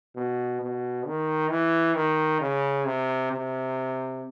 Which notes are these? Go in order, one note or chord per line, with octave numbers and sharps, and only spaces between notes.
B2
B2
D#3
E3
D#3
C#3
C3
C3